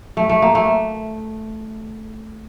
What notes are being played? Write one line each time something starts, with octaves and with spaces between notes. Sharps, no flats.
A3
A3
A#3
A3